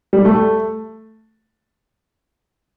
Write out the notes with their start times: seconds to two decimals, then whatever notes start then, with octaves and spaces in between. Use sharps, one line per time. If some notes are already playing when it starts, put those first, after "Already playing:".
0.13 G3
0.25 A3